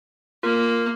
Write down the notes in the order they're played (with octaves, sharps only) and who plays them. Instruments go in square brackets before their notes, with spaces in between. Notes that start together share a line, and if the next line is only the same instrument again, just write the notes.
[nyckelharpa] A#3 [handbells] F4 A#4